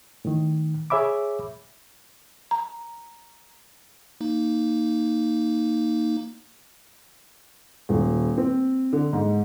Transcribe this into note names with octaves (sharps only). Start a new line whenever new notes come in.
A2 D#3
G#4 C#5 E5 B5 D6
A#5
A#3 D#4
D#1
C4
D3
G#2